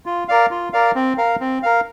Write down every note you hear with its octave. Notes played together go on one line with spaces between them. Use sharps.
F4
A#4 D5 F5
F4
A#4 D5 F5
C4
A#4 F5
C4
A#4 F5